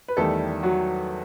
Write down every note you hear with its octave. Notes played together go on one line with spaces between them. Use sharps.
B4
E2 D#3 G3 A3 A4
F#3 F#4